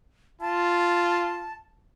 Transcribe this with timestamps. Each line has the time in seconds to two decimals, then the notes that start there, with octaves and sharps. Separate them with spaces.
0.41 F4 A5